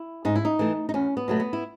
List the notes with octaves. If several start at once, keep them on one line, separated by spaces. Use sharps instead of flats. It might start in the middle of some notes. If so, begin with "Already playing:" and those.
Already playing: E4
G#2 D#4
E4
D#4
E3 A3
D#4
E2 C#4
B3
B2 F#3 A3
B3
E4